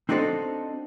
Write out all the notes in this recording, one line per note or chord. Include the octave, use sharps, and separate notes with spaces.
C4 D4 D#4 F#4 A4 C5